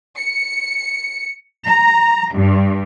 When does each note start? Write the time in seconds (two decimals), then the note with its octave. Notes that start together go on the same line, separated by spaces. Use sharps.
0.18 C#7
1.66 A#5
2.34 G2